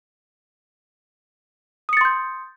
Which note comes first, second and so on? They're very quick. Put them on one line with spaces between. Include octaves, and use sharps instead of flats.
D#6 C#7 A6 C6 G6